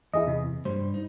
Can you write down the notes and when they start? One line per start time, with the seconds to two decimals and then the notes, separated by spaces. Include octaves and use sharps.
0.13 E2 E4 G#4 D#5
0.27 C3
0.65 G2 G3 C5
0.94 D#4